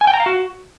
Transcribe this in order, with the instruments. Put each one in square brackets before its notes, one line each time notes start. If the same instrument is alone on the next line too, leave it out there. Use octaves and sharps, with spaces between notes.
[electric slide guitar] G#5
G5
A#5
F5
F#4